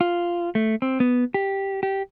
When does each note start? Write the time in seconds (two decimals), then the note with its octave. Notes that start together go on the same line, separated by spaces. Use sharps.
0.01 F4
0.55 A3
0.82 C4
1.00 B3
1.34 G4
1.83 G4